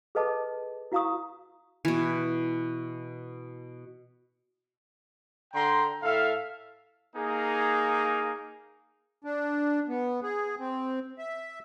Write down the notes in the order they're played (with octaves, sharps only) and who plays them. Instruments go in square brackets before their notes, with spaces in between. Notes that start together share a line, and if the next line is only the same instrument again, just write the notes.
[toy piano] G#4 A4 B4 D#5 A5 D6
E4 F#4 F5 A#5 C#6 D#6
[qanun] B2 E3
[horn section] D3 G5 A#5 C6
A2 A4 E5 F5
[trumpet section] A#3 D#4 G#4
[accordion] D4
B3
G#4
C4
E5